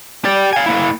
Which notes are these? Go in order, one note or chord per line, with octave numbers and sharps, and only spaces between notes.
G4 D5
F5 G#5
A#3 E4